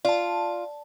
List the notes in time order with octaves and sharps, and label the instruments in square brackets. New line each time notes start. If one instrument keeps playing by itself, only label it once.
[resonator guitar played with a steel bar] F4 [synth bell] D5 A5